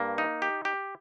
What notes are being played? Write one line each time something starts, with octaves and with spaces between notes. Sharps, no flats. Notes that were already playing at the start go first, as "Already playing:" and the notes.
Already playing: G2 A#3
D#4
G4
G4